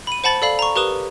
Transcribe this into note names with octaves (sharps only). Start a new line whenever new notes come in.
B5 D#7
C5 F#5 A5 B5 A6
A4 D5 F5 B5
A#5 C#6
G4 A#4 B4 D#6 E7